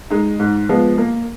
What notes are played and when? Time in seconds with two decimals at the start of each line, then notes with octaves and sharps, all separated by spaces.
0.11 G#3 D#4
0.40 G#2
0.69 F3 G#3 B3
0.98 A#3